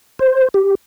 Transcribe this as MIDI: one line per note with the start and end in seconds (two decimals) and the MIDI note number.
0.19 0.48 72
0.54 0.75 67